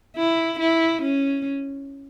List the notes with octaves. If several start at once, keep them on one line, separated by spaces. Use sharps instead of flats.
E4
E4
C#4